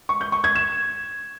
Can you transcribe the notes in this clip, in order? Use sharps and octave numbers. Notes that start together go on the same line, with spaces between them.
C#6
G6
C#6
G#6
E7